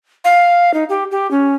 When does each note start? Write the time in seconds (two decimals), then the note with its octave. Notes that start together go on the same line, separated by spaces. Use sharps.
0.24 F5
0.74 D#4
0.89 G4
1.11 G4
1.31 C#4